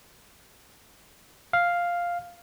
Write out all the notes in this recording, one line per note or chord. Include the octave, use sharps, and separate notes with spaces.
F5